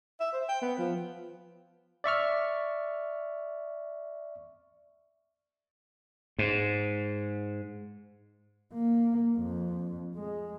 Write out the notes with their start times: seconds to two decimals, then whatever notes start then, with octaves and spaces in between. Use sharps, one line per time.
0.20 E5
0.33 C5
0.48 G5
0.61 B3
0.78 F3
2.04 D5 E5 C#6 F6
6.39 G#2
8.74 A#3
9.38 F2
10.16 G#3